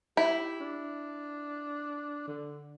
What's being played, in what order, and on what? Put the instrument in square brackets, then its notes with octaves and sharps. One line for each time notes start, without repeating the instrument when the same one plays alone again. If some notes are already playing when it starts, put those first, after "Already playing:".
[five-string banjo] E4 [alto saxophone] G4
[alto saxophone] D4
D3